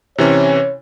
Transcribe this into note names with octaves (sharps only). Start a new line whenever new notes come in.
C3 E3 C#4 C#5